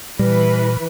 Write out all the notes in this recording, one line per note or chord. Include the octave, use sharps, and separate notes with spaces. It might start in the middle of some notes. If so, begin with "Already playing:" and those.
A#2 E3 G3 B4